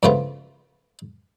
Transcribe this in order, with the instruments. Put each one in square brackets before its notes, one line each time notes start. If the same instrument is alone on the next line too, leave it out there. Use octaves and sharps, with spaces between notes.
[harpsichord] G2 C#3 F3 A3 B3 F4